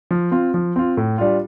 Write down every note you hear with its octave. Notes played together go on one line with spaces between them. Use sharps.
F3
C4 F4
F3
C4 F4
A2
G3 D4 F4